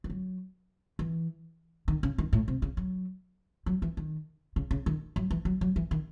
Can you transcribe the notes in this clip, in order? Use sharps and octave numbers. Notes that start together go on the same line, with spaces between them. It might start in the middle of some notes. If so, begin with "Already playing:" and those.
E3
F#3
E3
D#3
C#3
D#3
A2
C3
C#3
F#3
F#3
E3
D#3
C#3
C#3
D#3
F#3
E3
F#3
F#3
E3
D#3